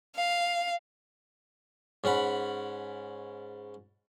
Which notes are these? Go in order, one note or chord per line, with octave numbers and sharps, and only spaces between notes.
F5
G#2 C#4 F#5 B5